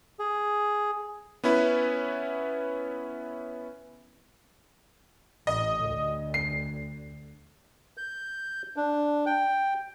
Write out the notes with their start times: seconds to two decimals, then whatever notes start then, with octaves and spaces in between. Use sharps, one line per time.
0.19 G#4
1.44 B3 C#4 E4 B4
5.47 A1 D#5
5.85 D2
6.34 C7
7.97 G6
8.76 D4
9.26 G5